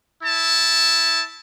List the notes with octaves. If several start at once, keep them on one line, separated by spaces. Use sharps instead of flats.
E4 A5